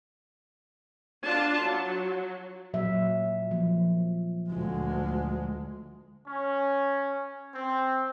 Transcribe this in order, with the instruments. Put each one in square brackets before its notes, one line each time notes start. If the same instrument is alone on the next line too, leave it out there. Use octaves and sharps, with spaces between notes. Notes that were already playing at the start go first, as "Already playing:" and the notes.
[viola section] D4 F4 A5
F#3
[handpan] A#2 F#3 E5
F3 A#3
[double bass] D2 G#3 [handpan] A#2 F4
[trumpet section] C#4
C4